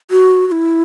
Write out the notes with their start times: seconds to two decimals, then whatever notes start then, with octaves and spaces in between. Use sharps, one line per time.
0.11 F#4
0.47 F#4
0.52 E4